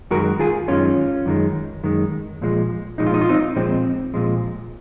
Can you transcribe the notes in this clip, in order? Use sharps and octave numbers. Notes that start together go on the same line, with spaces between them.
F#2 D#3 G#3 F#4 A#4
F4 G#4
F#2 D#3 G#3 C#4 F4
F#2 D#3 G#3
F#2 D#3 G#3
A#2 F3 G#3
A#2 F3 G#3 D#4
F4
D#4
F4
C4 D#4
A#2 F3 G#3 C4
A#2 F3 G#3